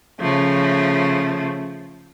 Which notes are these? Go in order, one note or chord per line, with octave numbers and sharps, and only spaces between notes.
C#3 F3 A3